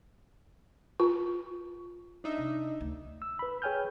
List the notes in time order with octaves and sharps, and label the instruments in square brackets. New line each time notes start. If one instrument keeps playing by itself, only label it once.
[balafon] F4
[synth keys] D4 D#4 E5
[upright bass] C3
D2
[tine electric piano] E6
B4 B5
G#4 C#5 G5 G#5 F6 G6